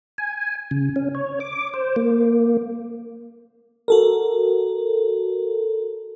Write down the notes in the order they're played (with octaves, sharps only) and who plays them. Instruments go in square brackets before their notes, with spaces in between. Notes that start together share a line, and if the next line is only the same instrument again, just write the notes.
[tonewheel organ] G#5
C#3
C#4
C#5
D6
C5
A#3
[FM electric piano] F#4 A4 A#4